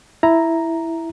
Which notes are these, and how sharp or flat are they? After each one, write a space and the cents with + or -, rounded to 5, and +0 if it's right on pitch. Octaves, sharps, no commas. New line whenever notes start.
E4 +0 A#5 +0